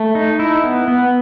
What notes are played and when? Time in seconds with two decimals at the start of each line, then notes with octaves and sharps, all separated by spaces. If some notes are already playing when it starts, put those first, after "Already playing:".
Already playing: A3
0.15 D#4
0.39 E4
0.64 B3
0.88 B3